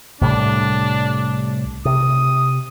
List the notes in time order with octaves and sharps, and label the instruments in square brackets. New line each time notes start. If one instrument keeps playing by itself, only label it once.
[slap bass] C2 A2 G3 [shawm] D4
[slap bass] C3 [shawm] D#6